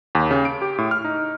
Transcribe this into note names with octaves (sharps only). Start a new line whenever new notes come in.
D#2
C#3
D7
G4
A2
F6
D#4